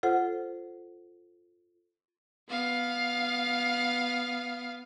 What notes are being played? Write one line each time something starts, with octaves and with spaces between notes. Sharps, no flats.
F4 A4 C5 F#5
B3 F5